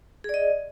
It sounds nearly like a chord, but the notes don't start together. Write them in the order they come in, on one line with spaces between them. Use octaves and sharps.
G#4 D5 D#5